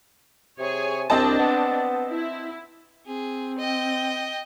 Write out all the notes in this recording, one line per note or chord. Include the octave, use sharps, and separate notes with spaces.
C3 G#4 C#5 G#5
C2 C4 D4 D#5 A5
B3
E4
C4 G#4
D#5 G5